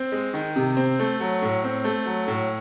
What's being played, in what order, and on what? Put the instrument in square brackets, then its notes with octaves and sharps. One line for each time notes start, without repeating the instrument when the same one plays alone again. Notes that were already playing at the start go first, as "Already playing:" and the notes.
Already playing: [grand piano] C4
G#3
D#3
C3
C4
A3
F#3
A2
C4
A3
F#3
A2